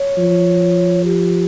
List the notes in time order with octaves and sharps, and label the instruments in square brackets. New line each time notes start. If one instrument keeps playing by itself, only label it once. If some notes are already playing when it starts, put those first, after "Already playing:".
Already playing: [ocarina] C#5
[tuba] F3
[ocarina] G4